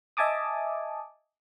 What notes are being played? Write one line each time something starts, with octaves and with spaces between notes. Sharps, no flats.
D#5 E5 G#5 A5 D6 D#6